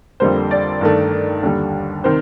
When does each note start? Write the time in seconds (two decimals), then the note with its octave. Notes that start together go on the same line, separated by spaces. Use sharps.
0.20 F2 D3 G3 A#3 C5
0.51 D5
0.81 G2 D#3 A3
1.43 D#2 D3 G3
2.04 C3 D#3 C5